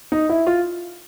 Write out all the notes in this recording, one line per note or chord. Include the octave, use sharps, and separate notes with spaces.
D#4
E4
F4